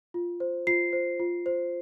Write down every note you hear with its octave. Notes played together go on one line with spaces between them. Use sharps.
F4
C5
F4 C7
C5
F4
C5